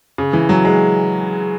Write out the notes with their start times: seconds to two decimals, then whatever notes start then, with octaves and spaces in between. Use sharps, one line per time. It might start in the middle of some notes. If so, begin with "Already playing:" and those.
0.18 C#3
0.33 E3
0.49 F#3
0.65 G#3